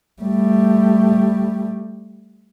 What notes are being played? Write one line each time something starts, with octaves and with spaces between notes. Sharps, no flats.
G3 A3